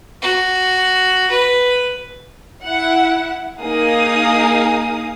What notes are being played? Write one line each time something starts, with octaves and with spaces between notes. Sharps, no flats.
F#4
B4
E4 F#5
A#3 D#4 G#4 F5 D#6